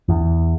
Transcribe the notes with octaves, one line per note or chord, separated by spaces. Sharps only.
E2